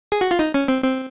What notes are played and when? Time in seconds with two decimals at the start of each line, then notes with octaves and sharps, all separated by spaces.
0.12 G#4
0.21 F#4
0.31 F4
0.39 D#4
0.54 C#4
0.68 C4
0.83 C4